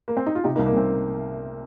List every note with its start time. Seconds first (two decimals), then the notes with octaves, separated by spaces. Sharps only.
0.08 A#3
0.17 C4
0.26 D#4
0.35 F4
0.44 C3 D#4 G4
0.56 A#3 D#4
0.59 C2
0.66 A#3
0.73 C2 C4